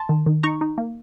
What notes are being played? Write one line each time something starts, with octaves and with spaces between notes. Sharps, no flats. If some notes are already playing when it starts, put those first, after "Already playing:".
Already playing: A5 C6
D#3
D#3
D#4 A#5 C#6
D#4
A#3